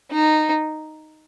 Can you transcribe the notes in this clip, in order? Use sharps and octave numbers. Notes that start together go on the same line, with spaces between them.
D#4